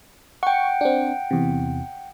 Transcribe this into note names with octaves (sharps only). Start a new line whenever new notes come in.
F#5 G5 C#6
C4 D4
E2 C3